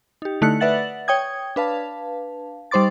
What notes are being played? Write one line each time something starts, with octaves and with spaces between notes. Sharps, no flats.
D#4 G4
D3 A3 D#4 E4 F#6 C#7
B4 D5 E5 F#5 A6 F#7
C#5 G5 D#6 G#6
D4 B4 F5 A5
G3 D#4 C5 C6 D6 A6